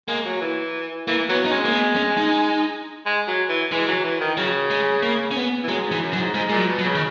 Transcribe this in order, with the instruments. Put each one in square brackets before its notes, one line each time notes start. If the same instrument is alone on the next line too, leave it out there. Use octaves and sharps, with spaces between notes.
[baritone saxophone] G#3 [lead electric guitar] A#3
[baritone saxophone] F#3
E3
[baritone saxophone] E3 [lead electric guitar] A#3
[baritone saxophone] F#3 [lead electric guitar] B3
[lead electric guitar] D#4
[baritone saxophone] G#3 [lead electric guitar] C#4
[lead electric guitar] A#3
B3
C#4
D#4
[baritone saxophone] G#3
F#3
E3
[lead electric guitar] E3 [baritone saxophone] G#3
[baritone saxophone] F#3
E3
D#3
[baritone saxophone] C#3 [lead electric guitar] F#3
[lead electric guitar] G#3
A#3
C#4
B3
[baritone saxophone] E3
[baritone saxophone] F#3 [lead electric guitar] G#3
[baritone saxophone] G#2
[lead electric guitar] E3
[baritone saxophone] F#2
[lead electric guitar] F#3
[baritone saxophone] G#2
[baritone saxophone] G#2 [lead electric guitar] G#3
[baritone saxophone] A#2 [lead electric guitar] G#3
[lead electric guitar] F#3
[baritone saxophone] B2
[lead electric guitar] F#3
[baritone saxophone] C#3
[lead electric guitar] D#3